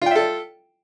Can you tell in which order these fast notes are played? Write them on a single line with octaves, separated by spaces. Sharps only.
F4 G5 E5 A4